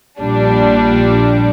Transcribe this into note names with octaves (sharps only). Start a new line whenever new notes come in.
A#1 A#2 G3 D4